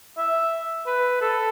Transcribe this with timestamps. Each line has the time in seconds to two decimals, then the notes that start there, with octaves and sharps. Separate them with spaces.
0.17 E5
0.87 B4
1.21 A4